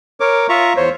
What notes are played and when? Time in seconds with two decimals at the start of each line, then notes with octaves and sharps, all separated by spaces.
0.20 A#4 C#5 D6
0.49 F4 E5 A#5 C#6
0.76 E2 C5 C#5